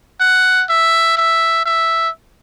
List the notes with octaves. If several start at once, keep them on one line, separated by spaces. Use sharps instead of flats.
F#5
E5
E5
E5